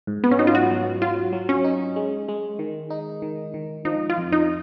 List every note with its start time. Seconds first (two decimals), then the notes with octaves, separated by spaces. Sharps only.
0.07 G#2
0.24 B3
0.32 C#4
0.39 F#3 D#4
0.47 F4
0.55 F#4
0.70 F#3
1.02 F#3 F4
1.33 F#3
1.49 C#4
1.64 D#4
1.96 G#3
2.28 G#3
2.59 D#3
2.90 D#4
3.22 D#3
3.54 D#3
3.85 F3 D#4
4.10 F4
4.18 F2
4.32 D#4